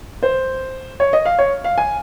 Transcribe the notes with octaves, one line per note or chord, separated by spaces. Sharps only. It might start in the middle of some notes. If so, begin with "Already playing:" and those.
C5
C#5
D#5
F5
C#5
F5
G#5